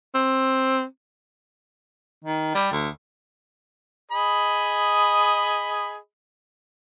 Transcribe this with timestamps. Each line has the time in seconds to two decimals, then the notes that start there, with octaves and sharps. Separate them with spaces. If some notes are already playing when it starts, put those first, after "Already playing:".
0.15 C4
2.25 D#3
2.55 G3
2.72 D2
4.11 G#4 D#5 B5